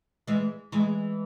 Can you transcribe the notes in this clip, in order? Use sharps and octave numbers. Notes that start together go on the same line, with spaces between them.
E3 G#3
E3 G#3